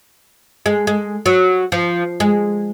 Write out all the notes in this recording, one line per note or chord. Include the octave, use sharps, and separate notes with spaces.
G#3
G#3
F#3
F3
G#3